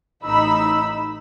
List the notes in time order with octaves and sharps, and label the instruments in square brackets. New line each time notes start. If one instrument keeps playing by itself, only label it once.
[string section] A1 D#4 B5 E6